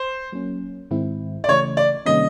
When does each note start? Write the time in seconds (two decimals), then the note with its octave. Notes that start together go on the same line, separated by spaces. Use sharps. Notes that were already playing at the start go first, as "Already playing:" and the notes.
Already playing: C5
0.32 F#3 A#3 C#4
0.91 G#2 D#3 G#3 C4 E4
1.44 D5
1.48 C#3 E3 A3 C#5
1.77 D5
2.06 C3 D#3 G3 A#3 C#4 D#5